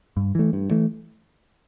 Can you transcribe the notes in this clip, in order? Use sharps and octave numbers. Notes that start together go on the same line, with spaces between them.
G2
E3 A3
G2
E3 A3